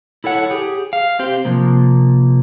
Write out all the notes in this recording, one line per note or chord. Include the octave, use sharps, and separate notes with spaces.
E4 A4 C#5 F#5
G4 G#4
F5
C4 G4 C5
C3 F3 A#3